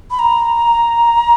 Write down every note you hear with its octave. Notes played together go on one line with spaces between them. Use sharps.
B5
A#5